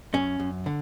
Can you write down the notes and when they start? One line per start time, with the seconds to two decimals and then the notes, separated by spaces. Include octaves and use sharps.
0.14 F#2 C#4
0.40 F#2
0.66 D3